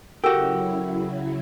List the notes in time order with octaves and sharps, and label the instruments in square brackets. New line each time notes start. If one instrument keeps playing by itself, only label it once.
[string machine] C#3 F#3 E4 [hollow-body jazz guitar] F#4 G4 [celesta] A4 A#4 E6